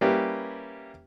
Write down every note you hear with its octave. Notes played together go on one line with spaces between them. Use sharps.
G3 A#3 C#4 E4 G4 B4